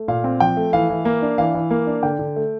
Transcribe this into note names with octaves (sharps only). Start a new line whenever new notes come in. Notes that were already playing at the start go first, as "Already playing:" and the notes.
Already playing: A3
A#2 F5
C4
F3 G5
A3
E3 F5
E3
A#3
D4
E3 F5
E3
A#3
D4
D3 G5
D3
A3